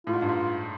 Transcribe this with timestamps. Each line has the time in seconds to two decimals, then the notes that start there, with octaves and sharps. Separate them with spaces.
0.07 A2 F4
0.13 G#2
0.22 G2
0.29 G#2